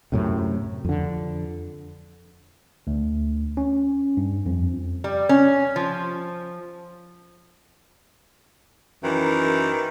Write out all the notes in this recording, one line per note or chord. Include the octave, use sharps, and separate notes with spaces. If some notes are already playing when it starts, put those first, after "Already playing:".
F#2 A2 C3
F2 D3
D2
C#4
G2
F2
G3
C#4
F3
F#2 D#3 E3